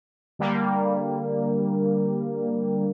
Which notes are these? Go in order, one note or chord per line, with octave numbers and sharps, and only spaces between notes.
D3 G3 A#3